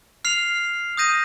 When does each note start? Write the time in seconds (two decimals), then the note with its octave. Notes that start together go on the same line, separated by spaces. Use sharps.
0.25 F6 C7 F7
0.97 D#6 G6 A#6 D#7